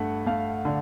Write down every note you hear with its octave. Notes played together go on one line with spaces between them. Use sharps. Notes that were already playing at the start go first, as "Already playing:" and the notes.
Already playing: G2 A3 F#5
A3 F5
D3